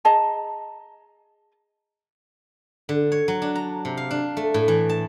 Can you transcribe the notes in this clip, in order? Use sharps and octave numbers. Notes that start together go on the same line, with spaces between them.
G#4 D#5 A5 A#5
D3
C#5
F#3
D4
A#5
C3
F5
D4
A3
A2
E3
A5